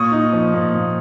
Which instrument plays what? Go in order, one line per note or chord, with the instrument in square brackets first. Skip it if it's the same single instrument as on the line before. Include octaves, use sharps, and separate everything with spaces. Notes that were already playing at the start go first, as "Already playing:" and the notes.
Already playing: [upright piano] A#2 [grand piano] C#6 D#6
[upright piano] D#4
F3
A#2
A#2